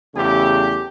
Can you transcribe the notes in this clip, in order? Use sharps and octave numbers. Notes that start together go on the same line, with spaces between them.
E2 C#3 A3 G4